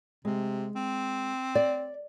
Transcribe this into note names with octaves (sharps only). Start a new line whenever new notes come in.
C3 G#3
C4
D5